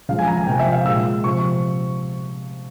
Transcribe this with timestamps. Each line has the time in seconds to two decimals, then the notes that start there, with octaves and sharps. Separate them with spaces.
0.09 C#3 F3 G#3 F5
0.19 G#5
0.27 A#5
0.37 G#5
0.47 C3 F3 A#3 G5
0.59 E5
0.72 F5
0.85 A#2 G#3 E6
1.24 C3 F3 C#6